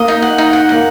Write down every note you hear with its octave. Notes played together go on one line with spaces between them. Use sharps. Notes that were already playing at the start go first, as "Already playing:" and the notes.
Already playing: A#3 D#5
D#4
F#5
D#4
F#5
A#3 F#5